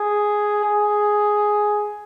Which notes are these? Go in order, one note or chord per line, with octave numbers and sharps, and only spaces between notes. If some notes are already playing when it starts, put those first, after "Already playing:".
Already playing: G#4
G#4